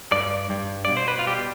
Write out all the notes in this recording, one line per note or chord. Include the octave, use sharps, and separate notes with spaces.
G2 D5
G2
B2 D5
C5
B4
F4
G3 G4